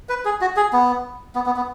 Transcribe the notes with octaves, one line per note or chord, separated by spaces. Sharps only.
B4
G#4
F#4
G#4
B3
B3
B3
B3